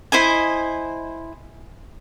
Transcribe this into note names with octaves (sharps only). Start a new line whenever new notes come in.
E4 C5 D#5 G#5